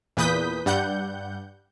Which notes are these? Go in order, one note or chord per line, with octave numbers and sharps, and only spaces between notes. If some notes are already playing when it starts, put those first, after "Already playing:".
E2 A#2 B4 D#6 G6 B6
G2 G3 F#5 G6